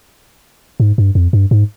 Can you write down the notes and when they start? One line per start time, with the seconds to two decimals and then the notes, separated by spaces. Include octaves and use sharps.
0.80 G#2
0.98 G2
1.15 F2
1.33 G2
1.51 G#2